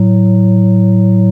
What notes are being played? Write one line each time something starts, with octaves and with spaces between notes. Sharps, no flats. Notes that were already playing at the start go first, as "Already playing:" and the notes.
Already playing: A2 F#3